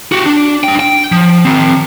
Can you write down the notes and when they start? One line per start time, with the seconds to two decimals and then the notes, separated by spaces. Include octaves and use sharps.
0.12 F#4 G4
0.26 D4
0.64 D4 G5
0.80 G5
1.12 F3
1.44 D#3 C4